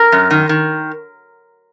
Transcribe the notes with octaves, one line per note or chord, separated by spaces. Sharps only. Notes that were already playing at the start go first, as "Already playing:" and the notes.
Already playing: A#4
F#2
D#3
D#3